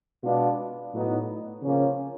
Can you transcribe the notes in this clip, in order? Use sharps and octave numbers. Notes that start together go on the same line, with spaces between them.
B2 G#3 B3 D4 F4
A2 F#3 B3 D#4
C#3 F3 A#3 C#4